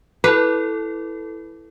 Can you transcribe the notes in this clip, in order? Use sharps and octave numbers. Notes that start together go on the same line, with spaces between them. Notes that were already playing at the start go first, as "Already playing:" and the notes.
E4 A4 B4